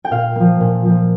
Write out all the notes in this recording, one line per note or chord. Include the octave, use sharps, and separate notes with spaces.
G5
A#2 F5
F3 A#3
A#2
F3 A#3